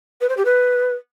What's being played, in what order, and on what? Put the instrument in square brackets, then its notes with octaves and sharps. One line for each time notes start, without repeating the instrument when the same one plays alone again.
[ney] B4
C5
G4
B4